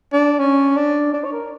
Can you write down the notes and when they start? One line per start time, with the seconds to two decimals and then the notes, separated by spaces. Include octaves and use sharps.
0.13 D4
0.39 C#4
0.76 D4
1.14 D4
1.25 C#5
1.32 A#4